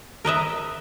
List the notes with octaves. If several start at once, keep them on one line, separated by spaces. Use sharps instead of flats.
A#4 B4 D#5 E5